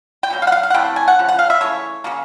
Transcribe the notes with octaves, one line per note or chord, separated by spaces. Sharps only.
G5
B2 F#3 A#3
F5
F#5
F5
F5
F#5
C3 E3 A3 G5
G#5
F#5
C#3 F3
F#5
F5
E5
C#3 E3 A3 C#5
C#3 F#3 A#3